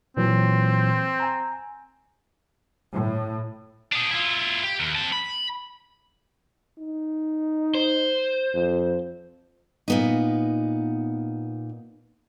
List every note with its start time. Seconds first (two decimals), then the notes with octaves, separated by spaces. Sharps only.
0.17 A#2 E3 F#3 C4
1.20 G#5 A#5
2.95 A2
3.92 D4 G#4
4.11 E4 F4
4.64 G4
4.80 D#2
4.95 C4 A5
5.12 B5
6.78 D#4
7.75 C5
8.54 F2
9.88 A#2 B3 D#4